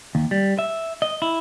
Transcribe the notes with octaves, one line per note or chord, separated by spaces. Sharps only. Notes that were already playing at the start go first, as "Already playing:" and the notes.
D#2
G3
E5
D#5
E4